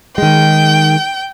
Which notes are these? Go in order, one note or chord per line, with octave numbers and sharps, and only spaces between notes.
D#3 G#3 G5